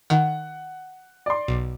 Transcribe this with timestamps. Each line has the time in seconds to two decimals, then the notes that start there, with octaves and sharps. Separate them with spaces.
0.10 D#3 F#5
1.26 D5 C6
1.48 B1